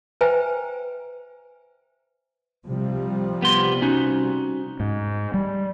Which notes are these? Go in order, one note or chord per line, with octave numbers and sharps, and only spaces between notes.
B4 C5 E5 G5 G#5 A#5
C3 F3 G3
B3 G4 C6
C#4 D#4 F#4
G#2
G3